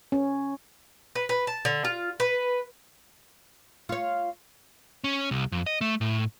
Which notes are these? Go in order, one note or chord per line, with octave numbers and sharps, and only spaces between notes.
C#4
B4
B4
A5
D3
F4
B4
F4 C#5
C#4
C2
F2
D#5
A3
A2